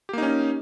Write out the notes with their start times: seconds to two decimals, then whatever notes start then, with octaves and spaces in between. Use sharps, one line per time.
0.09 G4
0.13 A#3
0.18 D#4
0.22 C#4